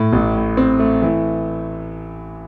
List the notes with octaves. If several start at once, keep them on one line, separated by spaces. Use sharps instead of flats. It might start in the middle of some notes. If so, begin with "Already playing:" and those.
Already playing: A2
A1
A2
C4
A3
E3